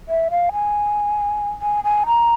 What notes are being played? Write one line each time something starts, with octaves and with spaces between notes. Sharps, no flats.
E5
F5
G#5
G#5
G#5
A#5